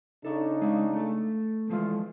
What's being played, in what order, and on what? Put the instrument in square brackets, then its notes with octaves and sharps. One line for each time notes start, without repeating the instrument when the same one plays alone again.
[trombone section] C#3 D4 D#4 [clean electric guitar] A4 C#5
[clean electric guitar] G#3 F5
A3 A4
[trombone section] E3 F4 A4 [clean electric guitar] F3 G#3 F5